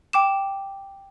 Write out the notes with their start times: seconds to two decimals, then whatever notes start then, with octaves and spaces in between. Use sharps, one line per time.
0.13 G5 D6 E7